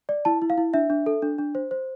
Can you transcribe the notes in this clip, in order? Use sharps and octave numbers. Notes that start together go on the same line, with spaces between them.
D5
E4 A5
E4
F5
E4
D4 E5
D4
A4
D4
D4
C5
C5